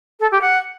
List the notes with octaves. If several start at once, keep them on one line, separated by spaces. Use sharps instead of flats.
A4
G4
F#5